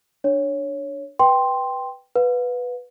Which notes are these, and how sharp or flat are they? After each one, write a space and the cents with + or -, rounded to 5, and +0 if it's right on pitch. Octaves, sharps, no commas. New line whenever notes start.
D4 +0 C#5 +0
B4 +0 G5 +0 C6 +0
B4 +0 F5 +45